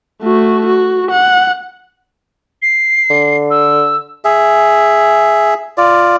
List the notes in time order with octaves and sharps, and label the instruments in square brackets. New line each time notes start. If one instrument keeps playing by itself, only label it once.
[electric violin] A3 F#4
F#4
F#5
[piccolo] C7
[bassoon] D3
[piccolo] E6
[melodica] G#4 E5
F4 D5